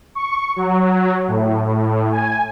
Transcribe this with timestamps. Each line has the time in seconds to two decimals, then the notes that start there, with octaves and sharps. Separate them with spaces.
0.15 C#6
0.56 F#3
1.28 A2
1.65 A2
2.12 G#5